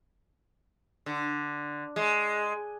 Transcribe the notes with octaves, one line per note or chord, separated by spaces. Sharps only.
D3
G#3